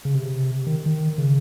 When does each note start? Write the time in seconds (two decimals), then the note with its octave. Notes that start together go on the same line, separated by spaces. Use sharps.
0.05 C#3
0.15 C3
0.67 D#3
0.86 D#3
1.18 C#3